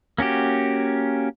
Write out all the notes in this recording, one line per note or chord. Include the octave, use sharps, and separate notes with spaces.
A#3 C#4 F#4 G4